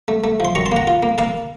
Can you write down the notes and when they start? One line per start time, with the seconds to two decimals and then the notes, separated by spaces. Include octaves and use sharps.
0.08 A3
0.24 A3
0.40 F3 C6
0.55 F#2 A#5 C#6
0.66 A5 C6
0.72 A#3 F#5 A#5
0.87 F4
1.03 A#3
1.18 A#3 F5 A5